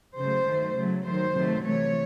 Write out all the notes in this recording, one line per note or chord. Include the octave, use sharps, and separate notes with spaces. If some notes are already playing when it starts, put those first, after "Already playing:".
C#3 F#3 A3 C5
D#3 F#3 A3
C#3 F#3 A3
D#3 F#3 A3 C5
C3 D#3 F#3 A3
C3 E3 A3 C#5